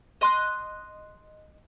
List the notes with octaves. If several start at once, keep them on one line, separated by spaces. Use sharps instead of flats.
D#5 C6 F#6